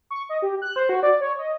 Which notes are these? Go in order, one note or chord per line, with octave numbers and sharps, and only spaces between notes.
C#6
D#5
G4
F#6
C5
F#4
D5
C#5
D#5